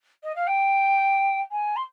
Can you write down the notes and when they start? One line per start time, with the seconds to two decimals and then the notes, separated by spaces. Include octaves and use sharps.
0.23 D#5
0.35 F5
0.47 G5
1.51 G#5
1.76 C6